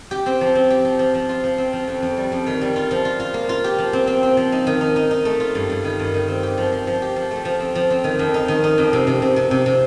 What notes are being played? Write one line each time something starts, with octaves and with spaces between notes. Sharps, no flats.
G4
C4
F3
C4
G4
F3
F3
F3
F4
F3
C4
F3
F2
F2
G3
F2
D#3
G3
F4
F3
F4
F4
A#3
F4
G4
F3
C4
C4
C4
F3
D#4
D#3
D#4
D#4
D#4
A3
F4
G2
G2
D#3
G2
D#3
C4
G4
F3
F3
F3
G4
F3
A3
F3
C4
F3
C4
D#3
F2
D#4
D#3
D#4
F2
C3
C3
C3
C3
C3
C3